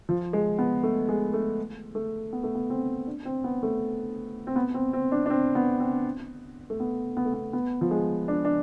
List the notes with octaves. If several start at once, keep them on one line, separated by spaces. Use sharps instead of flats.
F3
G#3
B3
A3
G#3
A3
A3
B3
A3
B3
C4
D4
C4
B3
A3
C4
B3
C4
C4
D4
D4
C4
B3
C4
A3
B3
B3
A3
B3
B3
F3
G#3
D4
D4